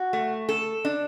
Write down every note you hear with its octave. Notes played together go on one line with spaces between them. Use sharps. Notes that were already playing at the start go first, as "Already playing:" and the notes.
Already playing: F#4
A3
A4
D4